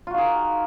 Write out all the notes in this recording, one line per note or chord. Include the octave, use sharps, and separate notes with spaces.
D#4 F4 F#4 G#4